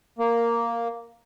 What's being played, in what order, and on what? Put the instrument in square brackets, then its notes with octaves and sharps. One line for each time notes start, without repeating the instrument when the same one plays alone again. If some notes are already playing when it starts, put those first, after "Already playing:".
[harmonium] A#3